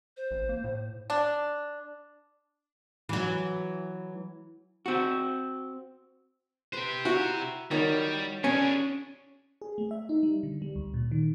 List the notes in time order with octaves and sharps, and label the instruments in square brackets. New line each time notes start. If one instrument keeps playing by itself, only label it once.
[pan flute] C5
[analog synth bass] A1
A#3
A2
[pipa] D4
[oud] E3 F#3
[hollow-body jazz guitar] C4 F#4
[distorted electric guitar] G4 C5 [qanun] B4
[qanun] E4 A#5 [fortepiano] F#4
[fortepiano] D#3 [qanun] F#3 G5 [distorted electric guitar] G3
[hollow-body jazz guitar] C#4 [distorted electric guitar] D4 G#4
[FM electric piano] G#4
A3
E5
D#4
G3
D3
G3
D2
A#2
D#3